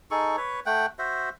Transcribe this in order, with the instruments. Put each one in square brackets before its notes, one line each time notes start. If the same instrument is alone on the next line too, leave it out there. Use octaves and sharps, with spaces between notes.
[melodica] D#4 G#4 A4 C#6
B4 C#5
A3 F#5 G5
F#4 C5 E5